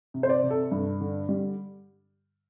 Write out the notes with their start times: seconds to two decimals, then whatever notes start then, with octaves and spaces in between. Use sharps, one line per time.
0.14 C3
0.23 C5
0.29 D5
0.44 C3
0.50 A4
0.71 G2
1.01 D3
1.29 G3